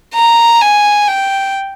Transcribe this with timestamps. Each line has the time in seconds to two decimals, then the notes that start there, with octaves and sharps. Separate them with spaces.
0.14 A#5
0.62 G#5
1.08 G5